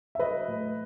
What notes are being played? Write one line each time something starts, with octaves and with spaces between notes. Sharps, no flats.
E5
F#3 B4 D#5
A2